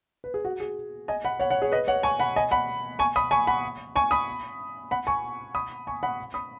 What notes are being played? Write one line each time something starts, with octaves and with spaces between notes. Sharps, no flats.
B4
G#4
F#4
G#4
D#5 G#5
F#5 B5
C#5 F#5
C#5 F#5
G#4 C#5
B4 D#5
C#5 F#5
G#5 C#6
F#5 B5
D#5 G#5
F#5 B5
G#5 C#6
B5 D#6
G#5 C#6
F#5 B5
G#5 C#6
B5 D#6
F#5 B5
G#5 C#6
B5 D#6
G#5 C#6
F#5 B5
B5 D#6